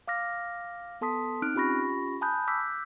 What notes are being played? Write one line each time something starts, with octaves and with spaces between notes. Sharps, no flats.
F5 D6 F6 A#6
B3 A4 A5 C6 D#6 B6
C4 D#4 F6 F#6 D7
C#4 F4 G4 B5 C#6 A#6
G#5 A5 B5 D#6 F#6 G6
D6 E6 F#6 G6 B6